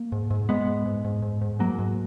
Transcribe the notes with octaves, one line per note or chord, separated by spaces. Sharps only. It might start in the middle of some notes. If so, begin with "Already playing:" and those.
Already playing: A#3
G#2
G#2
G#2 G#3 B3
G#2
G#2
G#2
G#2
G#2
G#2 F#3 A#3
G#2